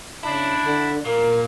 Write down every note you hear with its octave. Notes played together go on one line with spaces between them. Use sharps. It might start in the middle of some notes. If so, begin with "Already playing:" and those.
C#3 D4 E4
D3
A#2 A#4